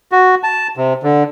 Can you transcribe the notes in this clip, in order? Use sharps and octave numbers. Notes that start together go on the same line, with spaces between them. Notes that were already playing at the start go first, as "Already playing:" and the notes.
F#4
A5
C3
D3